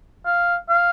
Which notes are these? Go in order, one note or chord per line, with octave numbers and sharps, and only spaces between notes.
F5
F5